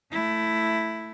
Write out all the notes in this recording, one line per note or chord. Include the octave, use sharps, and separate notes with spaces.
A3 E4